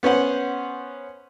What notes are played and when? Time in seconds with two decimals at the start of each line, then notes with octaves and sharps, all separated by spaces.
0.03 B3 C#4 C5 F#5